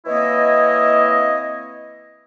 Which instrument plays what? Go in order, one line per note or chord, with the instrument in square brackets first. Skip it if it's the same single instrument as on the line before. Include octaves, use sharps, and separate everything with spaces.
[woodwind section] E3 A#3 C4 E4 C#5 D#5